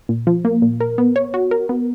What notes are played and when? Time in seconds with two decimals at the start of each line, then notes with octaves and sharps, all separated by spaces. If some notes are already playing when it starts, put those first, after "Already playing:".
0.09 A#2
0.27 F3
0.45 A#3
0.62 A#2
0.80 A#4
0.98 B3
1.16 C#5
1.34 F#4
1.51 A#4
1.69 B3